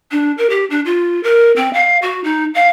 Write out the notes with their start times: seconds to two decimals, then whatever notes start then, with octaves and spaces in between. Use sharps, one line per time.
0.12 D4
0.38 A#4
0.50 G4
0.70 D4
0.85 F4
1.23 A#4
1.56 C4
1.74 F5
2.02 F#4
2.24 D#4
2.55 F5